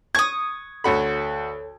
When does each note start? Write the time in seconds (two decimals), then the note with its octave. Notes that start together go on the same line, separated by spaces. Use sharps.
0.15 C#6 D#6 G#6
0.84 D2 F#4 A4 C#5 B5